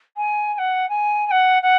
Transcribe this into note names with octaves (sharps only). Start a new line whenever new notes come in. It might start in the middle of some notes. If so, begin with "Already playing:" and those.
G#5
G#5
F#5
G#5
G#5
F#5
F#5